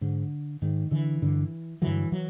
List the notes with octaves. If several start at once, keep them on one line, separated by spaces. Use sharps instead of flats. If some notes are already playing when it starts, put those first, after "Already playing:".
G#2 D3
G#2 D#3
D3 E3
G2 D3
G2 D3 E3 F#3
E3 F#3